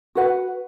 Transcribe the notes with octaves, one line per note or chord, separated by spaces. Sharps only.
F#4 B4 F#5